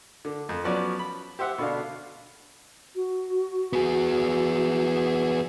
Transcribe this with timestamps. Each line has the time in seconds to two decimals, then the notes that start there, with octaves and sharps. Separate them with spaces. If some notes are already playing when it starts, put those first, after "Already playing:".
0.25 D3
0.49 F2
0.64 F3 F#3 B3 C#4 F#4 D5
0.99 B5
1.39 G4 C5 E5 F#5
1.58 B2 D3 D4 F5
2.96 F#4
3.73 B3 G#4